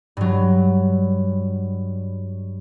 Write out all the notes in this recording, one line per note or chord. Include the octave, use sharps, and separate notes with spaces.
G2 F#3